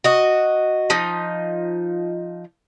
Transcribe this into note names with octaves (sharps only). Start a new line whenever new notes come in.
F#4 D#5
F3 D#4